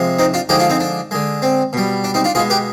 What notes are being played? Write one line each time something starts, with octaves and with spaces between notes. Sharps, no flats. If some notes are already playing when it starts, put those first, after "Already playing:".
Already playing: C3 F3 G#3
C4 D#4
D4 F4
D3 F3 G#3 D#4 G4
D4 F4
C4 D#4
D4
D3 G#3
C4
B2 G3
D4
C4 D#4
D4 F4
B2 G#3 F4 G#4
G4 B4